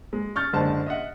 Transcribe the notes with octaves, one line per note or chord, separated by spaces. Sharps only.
G#3
C#6 F6 G6 A6
F#1 D3 G#3 C5 A5
D#5 E5 F#5